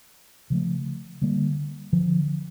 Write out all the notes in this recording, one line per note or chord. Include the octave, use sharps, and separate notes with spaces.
C#3 F3 A3
D3 G3 A#3
D3 F3